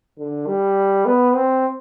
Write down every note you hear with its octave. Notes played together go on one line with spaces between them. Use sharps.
D3
G3
B3
C4